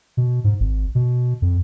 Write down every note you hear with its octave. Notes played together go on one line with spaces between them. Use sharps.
B2
G#2
G#1
B2
F2